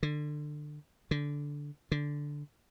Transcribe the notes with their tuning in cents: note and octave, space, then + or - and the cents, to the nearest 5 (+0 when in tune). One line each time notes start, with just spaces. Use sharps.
D3 +25
D3 -10
D3 -5